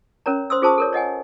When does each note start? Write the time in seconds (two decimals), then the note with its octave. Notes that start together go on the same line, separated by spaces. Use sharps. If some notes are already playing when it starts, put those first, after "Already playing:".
0.26 C#4 A#4 C#5 A#5
0.50 C5 C6 D#6 E6
0.62 F4 G#4 C5 A5 C#6 D#6
0.78 A4 A#4 C#5
0.93 C#5 D#5 F#5 G#5